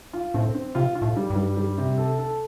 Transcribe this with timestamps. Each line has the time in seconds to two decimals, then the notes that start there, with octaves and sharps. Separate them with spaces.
0.13 F4
0.34 A2 C4
0.55 C4
0.75 C3 F4
0.95 F4
1.02 A2
1.17 G3
1.30 G2
1.36 G3
1.57 G3
1.78 C3
1.98 A4
2.18 A4